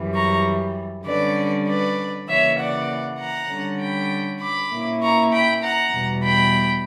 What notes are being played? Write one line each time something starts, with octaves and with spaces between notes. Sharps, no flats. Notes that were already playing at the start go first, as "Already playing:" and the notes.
Already playing: F#2 E3 G3
A#5 C#6
D3 G3 C#4 B4 D5
B4 D5
C#3 E3 A#3 C#5 E5
D5 F#5
F#5 A#5
D3 G3 C#4
G5 B5
B5 D6
A#2 A#3 C#4 E4
A#5 C#6
G5 B5
F#5 A#5
E2 B2 G3
G5 B5